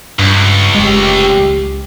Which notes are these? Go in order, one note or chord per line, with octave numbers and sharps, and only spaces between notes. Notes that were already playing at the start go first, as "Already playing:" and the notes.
C#2 G2
F1 G#3 A3 G4
C#2 C#3